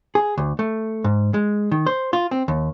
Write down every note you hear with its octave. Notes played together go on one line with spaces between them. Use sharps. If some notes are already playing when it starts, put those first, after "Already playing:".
G#4
D2
A3
G#2
G#3
D#3
C5
F4
C4
D#2